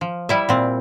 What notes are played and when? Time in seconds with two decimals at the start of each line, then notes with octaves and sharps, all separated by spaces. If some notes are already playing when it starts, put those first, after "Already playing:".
0.01 F3
0.29 G3 E4 E5
0.49 A#2 C4